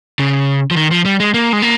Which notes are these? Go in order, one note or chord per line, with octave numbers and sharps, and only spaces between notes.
C#3
F3
D#3
F3
G3
G#3
A#3
G#3
A#3